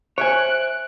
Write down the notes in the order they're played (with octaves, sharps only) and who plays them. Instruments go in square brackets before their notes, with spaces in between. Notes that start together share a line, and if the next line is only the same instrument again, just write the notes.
[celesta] C5 D7 [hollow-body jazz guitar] C#5 E5 G#5 [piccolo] F#6